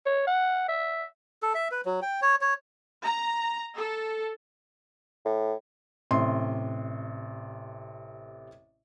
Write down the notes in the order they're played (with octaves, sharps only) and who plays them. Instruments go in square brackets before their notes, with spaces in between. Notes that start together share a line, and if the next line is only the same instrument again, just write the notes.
[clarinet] C#5
F#5
E5
[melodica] A4
E5
B4
F#3
G5
C#5
C#5
[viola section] A#5
A4
[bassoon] A2
[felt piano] A1 C3 C6